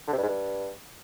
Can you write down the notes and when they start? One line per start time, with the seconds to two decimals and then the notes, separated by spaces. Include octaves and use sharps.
0.08 D3
0.13 C3
0.18 G2
0.23 G#2
0.28 G2